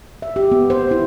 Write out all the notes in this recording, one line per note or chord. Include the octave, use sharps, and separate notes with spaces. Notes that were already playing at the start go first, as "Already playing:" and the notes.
E5
G4
B3
C5
E4